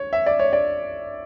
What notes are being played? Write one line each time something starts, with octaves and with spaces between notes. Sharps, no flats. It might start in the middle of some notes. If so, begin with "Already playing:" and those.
Already playing: C#5
E5
D5
C#5
D5